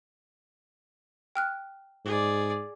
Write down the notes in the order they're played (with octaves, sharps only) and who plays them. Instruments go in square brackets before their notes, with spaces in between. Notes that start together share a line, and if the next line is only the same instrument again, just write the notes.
[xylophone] G5 F6 F#6
[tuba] G#2 [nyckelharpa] G#4 D5